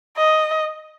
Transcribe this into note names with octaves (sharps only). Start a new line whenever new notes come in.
D#5